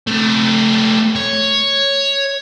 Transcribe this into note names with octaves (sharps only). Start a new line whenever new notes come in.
A3 C4
C#5